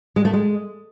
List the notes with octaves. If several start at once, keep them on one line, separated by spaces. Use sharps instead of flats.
G#3
A3
G#3